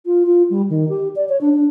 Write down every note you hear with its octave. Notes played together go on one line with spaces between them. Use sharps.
F4
F4
G3
D#3
G4
D5
C#5
D4
D4